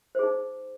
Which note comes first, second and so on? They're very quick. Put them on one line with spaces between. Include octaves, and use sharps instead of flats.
C5 G#4 D#4